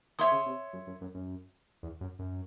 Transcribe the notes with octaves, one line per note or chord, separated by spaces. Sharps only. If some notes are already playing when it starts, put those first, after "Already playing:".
D#3 C#5 E5 C6 D#6
C#3
C3
F#2
F#2
F#2
F#2
E2
F#2
F#2